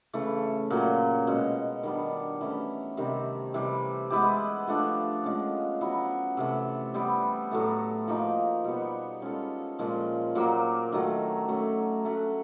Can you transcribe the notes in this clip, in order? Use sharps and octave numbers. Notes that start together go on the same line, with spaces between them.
C#3 E3 A3
A#2 F#3 A#3
B2 G#3 C#4
D#3 G3 B3 D4
E3 A3 C#4 E4
C3 D#3 G3 C4
C3 E3 G3
G#3 B3 E4 G4
F3 A3 D4
F3 G#3 C#4
F#3 B3 E4
C3 E3 A3
G3 B3 E4
A2 F#3 A3
F3 A#3 D#4
B2 G3 B3
G#3 C#4 F4 A4
A#2 F3 G#3
A#2 F#3 A#3
D#3 F#3 A3
F#3 A3 C#4
A3 C#4 F#4